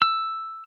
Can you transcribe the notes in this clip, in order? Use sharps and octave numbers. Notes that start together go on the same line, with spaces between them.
E6